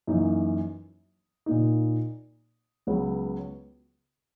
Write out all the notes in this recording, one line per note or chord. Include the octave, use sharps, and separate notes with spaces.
F#2 E3 A#3 D#4
A#2 A#3 D#4
C#2 C#3 F#3 B3